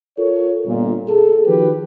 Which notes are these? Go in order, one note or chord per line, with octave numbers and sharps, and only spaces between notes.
F4 A4 A#4 C#5
G1 A#2
G#4 A4
D#3 F3 F#4 G4 B4